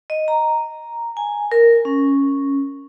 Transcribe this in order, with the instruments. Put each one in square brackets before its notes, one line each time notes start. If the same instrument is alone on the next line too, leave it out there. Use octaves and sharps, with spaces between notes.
[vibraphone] D#5
A#5
G#5
A#4
C#4